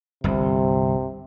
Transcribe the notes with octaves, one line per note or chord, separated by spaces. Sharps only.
G1 C2 C3